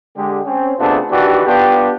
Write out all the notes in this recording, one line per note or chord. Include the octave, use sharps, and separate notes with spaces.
D3 G#3 G4
C4 C#4
C3 A3 B3 D4 F4 G#4
D#3 E3 D4 F#4 G4
B3 D4 F4 G4